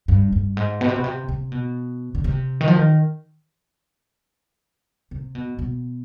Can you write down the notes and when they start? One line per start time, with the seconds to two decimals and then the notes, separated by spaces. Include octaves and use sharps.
0.08 G2
0.32 G2
0.57 G#2
0.81 B2
0.89 C3
0.96 B2
1.04 C3
1.29 C3
1.52 B2
2.15 D3
2.24 C3
2.61 D#3
2.68 F3
2.76 D#3
5.11 C3
5.35 B2
5.59 B2